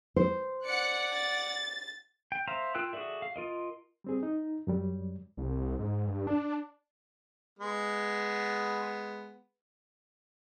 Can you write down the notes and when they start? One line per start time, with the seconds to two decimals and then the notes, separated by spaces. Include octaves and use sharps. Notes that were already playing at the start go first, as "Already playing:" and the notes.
0.16 C5
0.65 D5 F#5 F#6 C#7
1.13 A6
2.32 G5
2.47 C5 E5 F5 A#5
2.75 F4 A#4 G5 E6 F#6
2.93 F#4 G#4 A4 D5 E5
3.22 F5
3.36 F4 A#4 D#5
4.04 G3 C4 G#4
4.23 D#4
4.67 F#2 F#3 G3
5.37 C2
5.79 G#2
6.07 G2
6.27 D4
7.59 G#3 B3